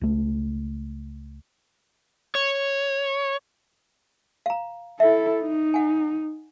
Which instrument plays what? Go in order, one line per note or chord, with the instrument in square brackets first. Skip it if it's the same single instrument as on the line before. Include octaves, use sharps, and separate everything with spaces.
[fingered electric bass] C#2 A3
[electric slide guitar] C#5
[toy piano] F5 A#5
[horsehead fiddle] E4 A4 [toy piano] E5
[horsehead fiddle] D#4
[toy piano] F#5 G#5